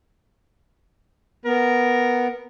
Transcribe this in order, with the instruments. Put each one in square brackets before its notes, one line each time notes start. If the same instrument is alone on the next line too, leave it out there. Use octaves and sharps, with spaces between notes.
[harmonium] B3 [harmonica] A#4